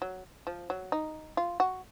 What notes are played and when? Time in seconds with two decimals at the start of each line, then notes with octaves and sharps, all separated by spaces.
0.02 F#3
0.47 F3
0.70 F#3
0.92 D#4
1.37 F4
1.60 F#4